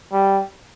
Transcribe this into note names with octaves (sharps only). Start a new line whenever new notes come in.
G3